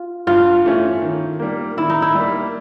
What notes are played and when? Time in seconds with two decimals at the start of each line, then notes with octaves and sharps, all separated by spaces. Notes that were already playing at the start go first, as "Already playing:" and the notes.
Already playing: F4
0.27 G2 F4
0.64 E3 A3 C#4
1.02 D#3
1.39 G3 A#3
1.77 D#3 E4
1.90 D#4
2.02 E4
2.15 G3 A#3